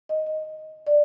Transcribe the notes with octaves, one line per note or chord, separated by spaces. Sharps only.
D#5
D#5
D5